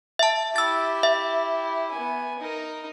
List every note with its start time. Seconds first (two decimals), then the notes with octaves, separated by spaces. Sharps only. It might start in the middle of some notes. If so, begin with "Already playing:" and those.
0.19 E5 A5
0.56 E4 G4 E6 A6
1.03 E5
1.92 B3 G#5
2.39 D#4 A#4